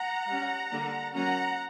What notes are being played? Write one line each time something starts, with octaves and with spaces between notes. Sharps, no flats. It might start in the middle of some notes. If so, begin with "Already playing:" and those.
Already playing: F#5 A#5
G3 C#4
D3 G3 A#3 D4
F#3 A#3 C#4 F#5 A#5